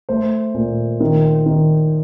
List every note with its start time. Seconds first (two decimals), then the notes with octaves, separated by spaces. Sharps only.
0.09 A3 C5
0.54 A#2
1.00 D#3
1.46 D#3